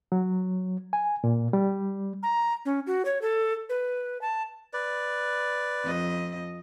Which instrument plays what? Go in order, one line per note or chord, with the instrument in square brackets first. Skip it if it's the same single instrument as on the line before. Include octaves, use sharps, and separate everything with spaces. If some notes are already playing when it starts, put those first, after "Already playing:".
[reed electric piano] F#3
G#5
A#2
G3
[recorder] A#5
C#4
F#4
C#5
A4
B4
A5
[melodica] B4 D5
[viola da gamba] F2 D#5